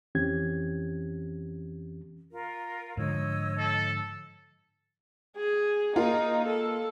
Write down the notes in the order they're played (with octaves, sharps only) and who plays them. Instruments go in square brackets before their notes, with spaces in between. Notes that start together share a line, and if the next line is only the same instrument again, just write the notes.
[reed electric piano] F2 E3 C4 C#4 G4 G#6
[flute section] F4 A#4
[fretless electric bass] G#2 D3 F3 [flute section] C#5 D#5 E6
[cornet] A4
[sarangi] G#4
[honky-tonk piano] A#3 F4 [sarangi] D#4
[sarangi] A4